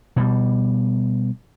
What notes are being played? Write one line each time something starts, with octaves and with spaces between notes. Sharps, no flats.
B2 G3